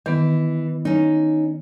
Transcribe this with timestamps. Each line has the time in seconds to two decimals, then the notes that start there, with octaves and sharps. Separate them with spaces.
0.06 D#3 E3 B3
0.85 C#4 D#4